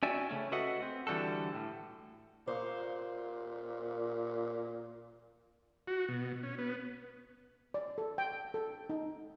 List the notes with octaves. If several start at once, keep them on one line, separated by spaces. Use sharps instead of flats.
C#4 F#4 D5 E5 G5 G#5
C#3 A3 C#4
F#4 A4 B4 D#5 E5 F#5
C4
D3 E3 G3 F#4 A4
A2
A#2 C5 F5
F#4
B2
C#4
B3
D5
A4
G5
A4
D#4